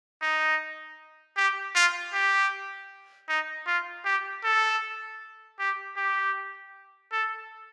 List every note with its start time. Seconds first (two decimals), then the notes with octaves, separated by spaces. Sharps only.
0.22 D#4
1.37 G4
1.75 F4
2.13 G4
3.29 D#4
3.67 F4
4.05 G4
4.44 A4
5.59 G4
5.97 G4
7.12 A4